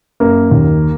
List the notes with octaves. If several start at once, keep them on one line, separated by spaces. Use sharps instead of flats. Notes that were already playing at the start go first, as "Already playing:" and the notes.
F#2 A#3
D#2